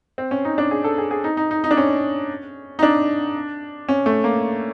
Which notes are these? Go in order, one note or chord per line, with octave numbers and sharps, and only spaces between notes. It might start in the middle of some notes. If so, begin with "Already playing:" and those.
C4
C#4
D#4
D4
G#4
A4
G#4
G#4
D#4
D#4
D#4
D#4
D4
C#4
D#4
D4
C#4
A3
A#3